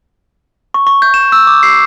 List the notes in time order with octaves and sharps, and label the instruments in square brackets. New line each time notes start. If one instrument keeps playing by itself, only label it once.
[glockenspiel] C#6
C#6
G6
E7
E6
D6
C7